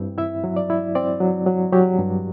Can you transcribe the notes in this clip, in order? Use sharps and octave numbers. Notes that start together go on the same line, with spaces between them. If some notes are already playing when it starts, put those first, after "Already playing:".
Already playing: G2 C4 E4
E4 E5
F#3
D5
E4
C4 D5
F#3
F#3
F#3 G4
G2